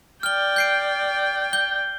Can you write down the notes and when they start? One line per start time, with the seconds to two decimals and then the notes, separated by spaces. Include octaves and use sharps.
0.23 D5 G5 F6 G7
0.56 G6 C7 D7
1.53 G6 G7